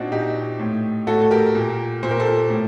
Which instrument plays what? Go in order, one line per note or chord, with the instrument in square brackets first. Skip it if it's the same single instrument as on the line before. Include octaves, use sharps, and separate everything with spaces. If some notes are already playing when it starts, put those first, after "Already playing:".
Already playing: [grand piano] A#2 C4 D4 D#4 F#4
A#2 D#4 G4
A2
A2 F#4 A4
A4
G4 A#4
A#2
A#2 C5
A#4
A4 C5
A2